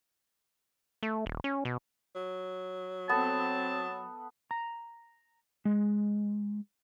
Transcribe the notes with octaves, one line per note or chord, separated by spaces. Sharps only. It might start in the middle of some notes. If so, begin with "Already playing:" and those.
A3
D#1
C#4
B2
F#3
B3 C4 A4 A5
A#5
G#3